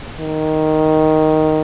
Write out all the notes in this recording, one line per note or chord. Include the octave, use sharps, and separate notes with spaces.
D#3